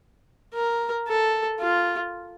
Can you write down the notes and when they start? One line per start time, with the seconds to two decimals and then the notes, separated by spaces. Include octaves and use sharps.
0.54 A#4
1.08 A4
1.60 F4